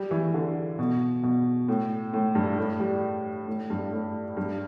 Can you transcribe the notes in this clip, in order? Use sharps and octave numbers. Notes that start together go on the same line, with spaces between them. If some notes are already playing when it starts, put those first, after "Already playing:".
Already playing: G3
E3
D3
B2
B2
A2
A2
G2
A2
G3
A2
G2
A2
G2